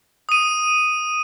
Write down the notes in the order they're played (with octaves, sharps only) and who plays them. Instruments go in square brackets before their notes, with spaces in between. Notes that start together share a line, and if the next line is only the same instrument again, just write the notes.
[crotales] D#6 D#7